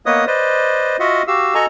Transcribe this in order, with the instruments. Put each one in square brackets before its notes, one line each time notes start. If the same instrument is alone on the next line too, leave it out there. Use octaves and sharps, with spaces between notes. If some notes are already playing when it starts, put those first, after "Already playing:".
[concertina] A#3 B3 B4 C#5 D#5 D#6
B4 C5 D5 D#5
F4 F#4 D#5 E5 F#5
F#4 G4 F5 E6
F#4 A4 D#5 G#5 A#5 C#6